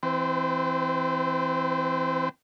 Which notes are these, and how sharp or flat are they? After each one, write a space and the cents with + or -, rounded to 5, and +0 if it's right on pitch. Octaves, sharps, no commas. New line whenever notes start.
E3 +0 C4 +0 C5 -45